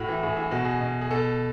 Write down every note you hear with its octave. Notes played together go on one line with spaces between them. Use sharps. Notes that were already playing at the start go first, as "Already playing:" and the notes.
Already playing: A2 F#4
E3
A2 G#4
E3 G#4
B2 F#4
G#4
B2
G#4
B2 A4